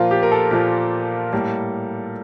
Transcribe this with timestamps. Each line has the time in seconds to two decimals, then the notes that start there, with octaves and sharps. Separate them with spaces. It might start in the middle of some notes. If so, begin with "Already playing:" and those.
Already playing: A#2 F3 A#3 F4
0.11 G4
0.23 A#4
0.32 A4
0.51 A#2 F3 A#3
1.33 A2 G3 A#3